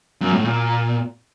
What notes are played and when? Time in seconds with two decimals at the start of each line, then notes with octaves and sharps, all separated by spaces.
0.21 F#2
0.33 A2
0.45 A#2